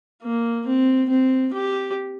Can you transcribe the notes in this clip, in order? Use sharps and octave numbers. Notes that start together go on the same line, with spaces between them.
A#3
C4
C4
G4